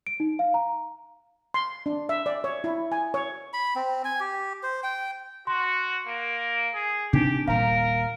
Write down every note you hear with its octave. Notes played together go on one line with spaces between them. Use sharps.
D7
D#4
F5
A#5
C6
D4
E5
D5
C#5
E4
G#5
C#5
B5
C4
G#5
G4
C5
G5
F#4 C6
A#3
G#4
C3 B3 C4 D4 D#4 G4
D#1 A#2 G3 A#4 F5 A#5